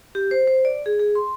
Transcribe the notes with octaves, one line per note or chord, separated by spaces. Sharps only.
G4
C5
C5
D5
G#4
G#4
C6